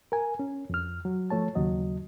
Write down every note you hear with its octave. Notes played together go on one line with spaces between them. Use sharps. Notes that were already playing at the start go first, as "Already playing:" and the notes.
A#4 G#5
C#4
F2 F6
F#3
F3 A3 C#5 A5
D#2 C#3 F#3 D#5